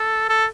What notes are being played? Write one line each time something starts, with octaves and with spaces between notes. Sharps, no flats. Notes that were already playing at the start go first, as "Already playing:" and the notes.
Already playing: A4
A4